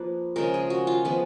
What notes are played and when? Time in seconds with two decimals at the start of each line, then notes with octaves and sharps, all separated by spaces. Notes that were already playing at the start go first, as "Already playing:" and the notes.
Already playing: F3 A#3 B4
0.36 C#3 F3 G#3 A#4
0.54 G#4
0.70 F#4
0.87 F4
1.05 F3 G#3 B3 B4